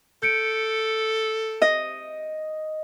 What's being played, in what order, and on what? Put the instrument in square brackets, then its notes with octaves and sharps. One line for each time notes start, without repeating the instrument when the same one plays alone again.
[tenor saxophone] A4 [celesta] G6 C#7 D7
[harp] D#5